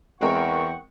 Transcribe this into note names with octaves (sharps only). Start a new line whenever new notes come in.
E2 G#3 C4 A#4 F#5 G5 C#6